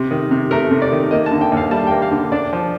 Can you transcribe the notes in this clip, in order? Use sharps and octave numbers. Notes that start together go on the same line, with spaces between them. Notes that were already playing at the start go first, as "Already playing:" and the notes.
Already playing: C3
D#3
C3
A3 A#4
C3
D5
D#3
A#3 D#5
A5
D3
G5
D#2
F5
G3 A5
G5
A#3
F5
D3
D4 D5
F3